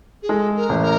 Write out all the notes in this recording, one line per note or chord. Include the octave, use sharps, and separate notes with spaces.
G#4
G#3 A4
A#4
A1
A#4